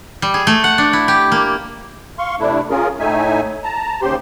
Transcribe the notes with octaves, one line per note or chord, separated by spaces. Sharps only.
G3
G#4
A3
F#5
D4
E4
G4
A#3
F5 C6 C#6
C3 A3 D4 E4
C#4 F4 G#4 A#4
A2 A3 D#4 E5 G#5
A5 A#5
D#2 C#3 G4 C5 C6